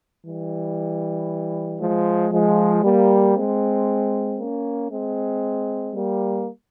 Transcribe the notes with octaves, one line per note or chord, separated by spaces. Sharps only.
E3 G3
F3 G#3
F3 G#3
G3 A#3
G#3 C4
A#3 C#4
G#3 C4
G3 A#3